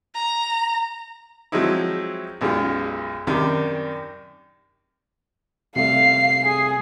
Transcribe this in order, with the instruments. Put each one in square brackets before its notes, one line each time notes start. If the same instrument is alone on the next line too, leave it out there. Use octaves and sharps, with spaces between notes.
[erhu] A#5
[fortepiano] F3 F#3 G#3 C4 D#4 E4
B1 F#2 G3 G#3 F4
F#2 C3 D#3 G3 D4
[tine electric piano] C3 G3 A3 [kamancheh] F5 [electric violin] C7
[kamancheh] G#4